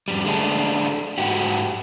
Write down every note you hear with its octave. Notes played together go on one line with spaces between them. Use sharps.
F2 G3
D3 G#3 A3 D4
G#2 F#4 G4